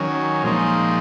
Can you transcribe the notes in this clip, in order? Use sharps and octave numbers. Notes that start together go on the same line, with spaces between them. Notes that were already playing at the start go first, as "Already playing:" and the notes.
Already playing: D#3 F#3 C#4
A#2 F3 G#3 D#4